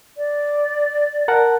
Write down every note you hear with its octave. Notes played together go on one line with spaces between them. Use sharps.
D5
A#4 F#5 A5